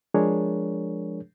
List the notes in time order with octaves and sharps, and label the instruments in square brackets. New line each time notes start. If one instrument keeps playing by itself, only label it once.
[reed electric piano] F3 G#3 D4 G#4 A#4 C#5